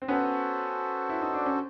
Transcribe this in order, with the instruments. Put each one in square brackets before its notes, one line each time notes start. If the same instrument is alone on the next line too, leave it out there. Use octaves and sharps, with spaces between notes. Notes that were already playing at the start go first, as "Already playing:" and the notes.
[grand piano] C4
[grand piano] B3 C#4 [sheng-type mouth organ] F#4 A4 C5
[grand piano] E4
D#4
D4
C#4